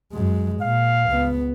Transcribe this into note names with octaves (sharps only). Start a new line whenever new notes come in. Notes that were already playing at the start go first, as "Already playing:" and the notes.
F#2 G#3
A#2 F5
C#2 B3